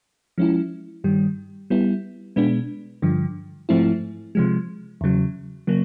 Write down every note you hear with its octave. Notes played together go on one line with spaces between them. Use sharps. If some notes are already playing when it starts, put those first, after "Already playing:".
F3 G#3 C#4 E4
G2 D#3 G3
G3 B3 E4
B2 G#3 B3 D4
G2 D3 F3
G#2 F3 A3 C4 E4
C3 F3 G#3
E2 C#3 F#3
C#3 F#3 A#3